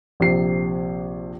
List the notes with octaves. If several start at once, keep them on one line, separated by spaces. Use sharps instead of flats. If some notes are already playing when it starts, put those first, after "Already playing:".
A#1 C3 C7